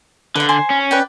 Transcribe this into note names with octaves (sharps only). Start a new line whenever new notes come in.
D3 B4 F5
C5 G#5 C6
C#4
B4 D5 G5